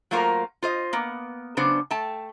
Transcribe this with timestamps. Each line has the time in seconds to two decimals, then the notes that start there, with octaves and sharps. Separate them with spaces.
0.11 F#3 A3 A#3 F4 A#4 C5
0.62 F4 C5 D#5
0.93 A#3 B3
1.57 C#3 F#3 B3 D4 C5
1.91 A3 G5 A5